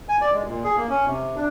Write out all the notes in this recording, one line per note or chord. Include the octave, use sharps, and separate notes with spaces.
G#5
D5
G#3
A#2
G#4
A#3
C#4
C3
D4